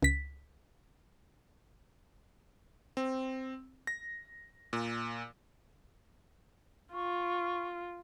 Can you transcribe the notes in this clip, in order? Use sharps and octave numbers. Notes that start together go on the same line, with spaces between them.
C#2 B6
C4
A#6
A#2
F4 C#6